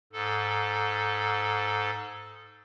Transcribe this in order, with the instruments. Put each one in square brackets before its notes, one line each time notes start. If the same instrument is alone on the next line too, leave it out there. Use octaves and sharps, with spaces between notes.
[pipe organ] G#2 A4